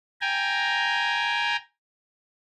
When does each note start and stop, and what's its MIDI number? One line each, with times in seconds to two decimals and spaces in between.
0.21 1.56 79
0.21 1.56 80
0.21 1.56 82